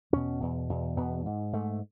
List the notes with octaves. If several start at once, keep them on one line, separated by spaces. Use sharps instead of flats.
E2 B2 C#4
E2 B2
E2 B2
E2 B2 B3
G#2
G#2 A3